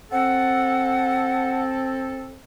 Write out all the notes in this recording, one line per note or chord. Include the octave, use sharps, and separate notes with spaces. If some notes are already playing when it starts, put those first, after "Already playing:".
C4 A4 F#5